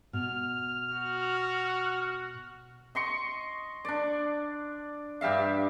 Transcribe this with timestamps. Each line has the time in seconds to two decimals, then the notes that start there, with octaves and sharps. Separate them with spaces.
0.13 B2 F6
0.92 F#4
2.95 D#5 C6 C#6
3.85 D4 D5
5.21 G2 G4 E5 F5